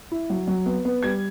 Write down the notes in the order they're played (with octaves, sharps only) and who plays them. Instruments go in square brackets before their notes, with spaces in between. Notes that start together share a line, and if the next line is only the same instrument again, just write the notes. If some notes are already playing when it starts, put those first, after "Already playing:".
[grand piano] E4
F#3
F#3
B3
B3
G3 G#6